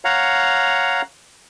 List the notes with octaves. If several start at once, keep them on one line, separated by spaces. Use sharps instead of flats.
C#5 F5 F#5 A#5